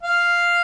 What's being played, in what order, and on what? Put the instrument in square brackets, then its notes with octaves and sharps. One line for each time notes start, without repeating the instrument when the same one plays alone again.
[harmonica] F5